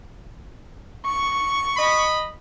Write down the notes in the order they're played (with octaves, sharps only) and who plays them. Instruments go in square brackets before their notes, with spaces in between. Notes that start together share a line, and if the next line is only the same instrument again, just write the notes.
[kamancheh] C#6
[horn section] D#5 B5